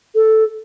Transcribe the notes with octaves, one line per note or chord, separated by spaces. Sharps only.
A4